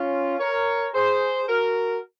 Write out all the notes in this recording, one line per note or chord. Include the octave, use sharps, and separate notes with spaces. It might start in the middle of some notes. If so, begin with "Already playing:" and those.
Already playing: C#4 F4
A#4 C#5
G#4 C5
F#4 A#4